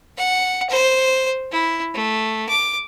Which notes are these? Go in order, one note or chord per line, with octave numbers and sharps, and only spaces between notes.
F#5
C5
E4
A3
D6